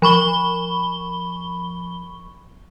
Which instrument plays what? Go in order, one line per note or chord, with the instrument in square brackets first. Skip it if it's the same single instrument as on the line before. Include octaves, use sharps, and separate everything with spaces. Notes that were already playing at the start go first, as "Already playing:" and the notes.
[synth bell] F3 B5 C#6 G7